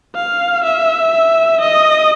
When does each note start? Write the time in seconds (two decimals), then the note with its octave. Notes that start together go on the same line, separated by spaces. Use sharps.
0.15 F5
0.63 E5
1.61 D#5